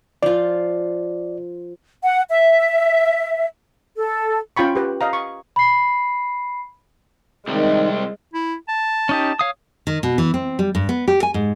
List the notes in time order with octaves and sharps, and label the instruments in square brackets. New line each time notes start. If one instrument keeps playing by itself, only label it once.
[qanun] F3 F4 [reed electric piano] D5
[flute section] F#5
E5
A4
[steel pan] C#4 F4 G5 B5 C#6
G4 B4
D#5 F5 A#5
C#6
[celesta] B5 C7
[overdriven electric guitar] C2 G3 [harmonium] D#3 [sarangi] G#3
[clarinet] E4
A5
[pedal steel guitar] C#4 D#4 G4
C#5 F5 D#6
[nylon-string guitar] D#3
B2
E3
C4
G3
G2
B3
G4
G#5
G#2